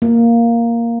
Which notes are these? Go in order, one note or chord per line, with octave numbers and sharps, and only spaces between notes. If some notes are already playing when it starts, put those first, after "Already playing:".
A#3